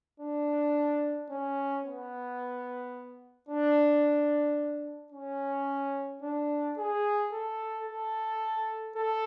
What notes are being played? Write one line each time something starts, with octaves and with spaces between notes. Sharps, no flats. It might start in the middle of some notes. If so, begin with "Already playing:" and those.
D4
C#4
B3
D4
C#4
D4
G#4
A4
A4
A4